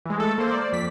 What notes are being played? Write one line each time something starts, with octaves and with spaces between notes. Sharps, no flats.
E3 G#3
A3 A4
A#3 C5
D5
F2 B6